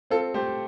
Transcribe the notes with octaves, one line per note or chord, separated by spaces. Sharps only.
C4 F4 A4
A3 G4 C5